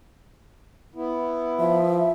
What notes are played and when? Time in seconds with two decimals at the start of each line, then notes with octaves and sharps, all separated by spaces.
0.95 B3 E4
1.59 F3 E5